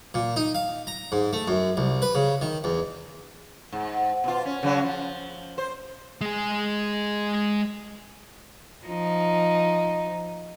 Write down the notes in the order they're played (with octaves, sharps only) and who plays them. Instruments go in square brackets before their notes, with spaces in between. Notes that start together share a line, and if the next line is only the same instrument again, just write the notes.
[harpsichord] A#2
D#4
F5
A#5
G#2
A3
F#2
C2
B4
C#3
D#3
E2
[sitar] G#2
B2 F4
C#4
C#3 F#3 C#4
F3
C5
[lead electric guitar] G#3 G#4
[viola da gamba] F3 D#4